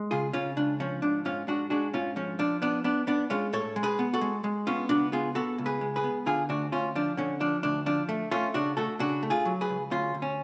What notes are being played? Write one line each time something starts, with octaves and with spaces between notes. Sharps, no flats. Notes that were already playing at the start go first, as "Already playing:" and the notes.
Already playing: G#3
C#3 F4 G#4
C#3 C#4 F4
C#2 D4
F3 C#4
G#2 D4
G#2 C#4 F4
G#2 D4 F#4
G#3 D4 F#4
G#2 C#4 F4
F3 C#4
F3 D4
B3 D4
B3 D4
B3 D4
G#3 C#4 F4
A2 A4 C#5
G#3
G#4 B4
B3
F#4 A4
G#3
G#3
B3 C#4 F4
C#2 D4 F#4
B3 F4 G#4
B3 F#4 A4
C#2
G#4 B4
G#3
G#4 B4
B3
D3 F4 G#4
D2 D4 F#4
D2 C#4 F4
F3 D4
D3 C#4
F3 D4
D2 D4
F3 D4
A3
A3 C#4 F4
C#3 D4 F#4
A3 F#4 A4
C#3 D4 F#4
A3
F4 G#4
F#3
G#4 B4
C#2
D2 C#4 F4
D2
C#4